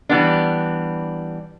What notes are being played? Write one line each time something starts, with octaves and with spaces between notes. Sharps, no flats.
E3 G3 B3 D4